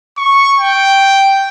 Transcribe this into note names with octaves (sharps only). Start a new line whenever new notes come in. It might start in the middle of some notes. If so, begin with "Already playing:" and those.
C#6
G5